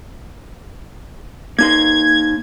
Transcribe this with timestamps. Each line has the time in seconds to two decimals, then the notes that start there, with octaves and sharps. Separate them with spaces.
1.58 A#3 D#4 C6 G#6